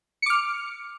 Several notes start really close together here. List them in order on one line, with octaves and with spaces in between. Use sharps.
C#7 D6 F6